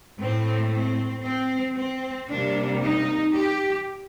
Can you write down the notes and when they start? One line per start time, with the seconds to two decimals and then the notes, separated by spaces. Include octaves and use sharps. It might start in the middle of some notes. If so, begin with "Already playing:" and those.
0.19 A2 A3 C4
0.72 C4
1.24 C4
1.76 C4
2.29 C3 G3 A#3 D4
2.82 D#4
3.34 G4